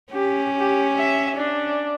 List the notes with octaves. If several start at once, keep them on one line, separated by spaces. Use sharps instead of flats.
C#4 G4
G4
E5
D4